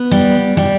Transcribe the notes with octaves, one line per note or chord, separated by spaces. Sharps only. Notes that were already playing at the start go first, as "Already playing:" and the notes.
Already playing: B3
G3
G3